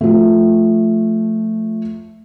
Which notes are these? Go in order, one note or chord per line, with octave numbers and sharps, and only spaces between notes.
F3 A3